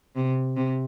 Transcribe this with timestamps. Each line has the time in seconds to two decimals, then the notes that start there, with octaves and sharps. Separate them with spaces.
0.16 C3
0.56 C3